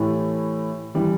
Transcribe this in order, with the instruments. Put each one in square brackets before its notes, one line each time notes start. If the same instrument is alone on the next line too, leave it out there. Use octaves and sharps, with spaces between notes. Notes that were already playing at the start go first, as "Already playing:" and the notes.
Already playing: [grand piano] A2 E3 A3 E4 G4
E3 G3